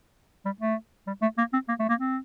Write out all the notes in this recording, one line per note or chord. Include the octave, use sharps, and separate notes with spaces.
G3
A3
G3
A3
A#3
C4
A#3
A3
A#3
C4